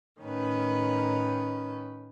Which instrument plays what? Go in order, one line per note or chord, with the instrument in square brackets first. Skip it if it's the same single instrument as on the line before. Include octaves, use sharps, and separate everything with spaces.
[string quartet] A2 D#3 C#4 B4